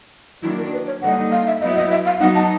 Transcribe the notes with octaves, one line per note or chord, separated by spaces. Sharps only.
D#3 F#3 A#3 D4 E4
A#4
B4
C#5
D3 G3 A#3 D#4 F#5
F5
E5
F#3 B3 E4 D#5
D#5
E5
F5
F#3 B3 D#4 F#5
A5